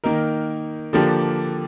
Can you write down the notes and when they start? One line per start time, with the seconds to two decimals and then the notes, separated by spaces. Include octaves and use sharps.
0.04 D#3 A#3 D#4 A#4
0.93 D3 F3 A#3 D4 G4